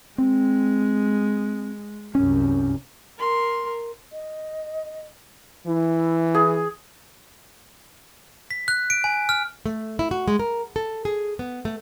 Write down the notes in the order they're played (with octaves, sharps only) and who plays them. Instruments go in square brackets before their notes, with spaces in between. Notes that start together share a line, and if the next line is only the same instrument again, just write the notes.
[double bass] G#3 [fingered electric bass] C4
[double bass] C2 F#2 [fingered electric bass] C#4
[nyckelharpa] A#4 C6
[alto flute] D#5
[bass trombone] E3 [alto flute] E4
[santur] G#4
[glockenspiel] B6
F#6
D7
G#5
F6
[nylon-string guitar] A3
E4
F#4
G#3
A#4
A4
G#4
B3
A3